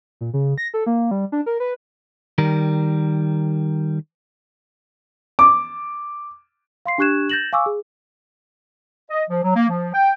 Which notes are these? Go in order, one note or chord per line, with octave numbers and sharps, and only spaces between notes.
A#2
C#3
A#6
A4
A#3
G3
D4
A#4
B4
D#3 G3 A#4
D6
F5 C6 C7
D4 G4 C#6 F#6 G#6 E7
G6 A6 A#6 E7 F#7
F5 G#5 C#6 D6 E6
G#4
D#5
F3
F#3
A#3
F3
G5